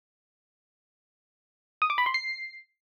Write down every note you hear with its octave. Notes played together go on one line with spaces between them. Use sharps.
D#6
D6
B5
C6
C7